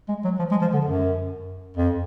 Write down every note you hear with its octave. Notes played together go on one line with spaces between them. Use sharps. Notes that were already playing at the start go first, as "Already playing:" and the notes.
G#3
F#3
F3
G#3
F3
D3
F#2
F2